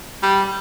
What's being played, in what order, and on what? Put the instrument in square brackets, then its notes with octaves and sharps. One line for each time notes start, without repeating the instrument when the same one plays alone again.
[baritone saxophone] G3